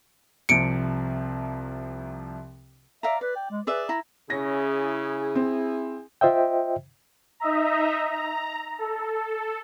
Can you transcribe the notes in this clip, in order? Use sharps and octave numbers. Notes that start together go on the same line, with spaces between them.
C2 C3 F3 C#7 D7
D5 E5 F5 A#5
B4 D5
G5
G#3
G#4 B4 D5 E5
E4 A#5
C#3 C#4 E4 G#4 A#6
C4
F4 C5 D#5 E5 G5
D#4 D#5 E5 A#5
A#5
A4